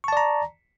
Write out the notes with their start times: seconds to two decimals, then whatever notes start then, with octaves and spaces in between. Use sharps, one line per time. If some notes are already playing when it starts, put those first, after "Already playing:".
0.04 C#6
0.08 A5
0.13 D5
0.17 A#5